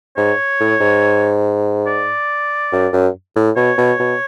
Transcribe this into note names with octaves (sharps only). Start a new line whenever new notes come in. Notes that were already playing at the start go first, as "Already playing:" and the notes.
G#2 C#5
A2
G#2
D5
F#2
F#2
A2
B2 C#5
B2
B2